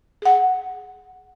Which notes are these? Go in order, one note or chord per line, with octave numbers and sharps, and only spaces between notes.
G#4 F#5